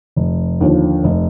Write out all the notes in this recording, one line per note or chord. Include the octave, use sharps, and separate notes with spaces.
F1
D#2 D3 F3
F1